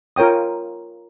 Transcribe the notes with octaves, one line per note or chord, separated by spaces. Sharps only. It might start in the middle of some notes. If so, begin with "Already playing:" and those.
F4 A#4 C#5 G5 D#6